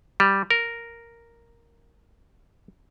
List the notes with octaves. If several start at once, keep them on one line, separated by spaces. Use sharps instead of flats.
G3
A#4